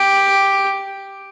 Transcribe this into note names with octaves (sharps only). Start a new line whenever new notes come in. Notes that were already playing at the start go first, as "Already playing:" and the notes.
Already playing: G4